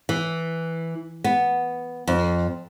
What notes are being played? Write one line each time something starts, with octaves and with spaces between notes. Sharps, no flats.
E3
B3
F2